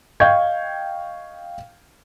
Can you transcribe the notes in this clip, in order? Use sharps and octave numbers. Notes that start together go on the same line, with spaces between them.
D#5 F5 G5 C#6 G6 G#6